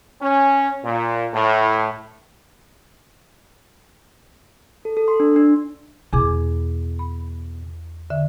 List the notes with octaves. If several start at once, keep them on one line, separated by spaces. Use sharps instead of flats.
C#4
A#2
A2
A4
A4
C6
D4
D4
E2 B2 G#4 D6
B5
D3 E5